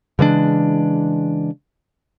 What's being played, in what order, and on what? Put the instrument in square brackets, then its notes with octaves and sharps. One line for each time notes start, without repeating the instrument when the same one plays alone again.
[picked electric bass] C#3 E3 G#3 D4